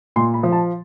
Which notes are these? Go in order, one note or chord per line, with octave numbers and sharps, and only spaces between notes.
A#2 C6
B5
F3
A5